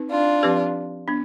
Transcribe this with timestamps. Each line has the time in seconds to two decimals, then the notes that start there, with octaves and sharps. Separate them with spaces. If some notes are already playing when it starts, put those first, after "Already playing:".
Already playing: C4 D#4 B4
0.10 D4 F4
0.43 F3 C4 G4 B4
1.08 B3 D4